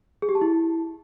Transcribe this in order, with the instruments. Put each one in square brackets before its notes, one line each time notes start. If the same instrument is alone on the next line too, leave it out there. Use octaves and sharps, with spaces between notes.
[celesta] G#4
G4
A5
E4